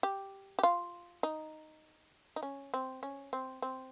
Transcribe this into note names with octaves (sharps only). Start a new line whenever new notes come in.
G4
G4
F4
D#4
D#4
C#4
C4
C#4
C4
C4